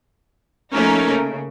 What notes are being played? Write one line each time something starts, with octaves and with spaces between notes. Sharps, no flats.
F3 A3 A#3 C#4 D#4 A#4
C#3